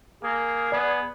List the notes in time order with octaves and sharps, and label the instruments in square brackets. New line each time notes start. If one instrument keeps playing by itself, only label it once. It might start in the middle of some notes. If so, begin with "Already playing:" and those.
[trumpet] A#3 [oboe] G#4
[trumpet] B3 [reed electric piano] D5